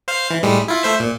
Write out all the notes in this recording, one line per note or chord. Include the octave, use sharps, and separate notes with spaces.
C5 F5 C7
E3
A2 G3 G#3
E4 F4
A3 C5 E5
A#2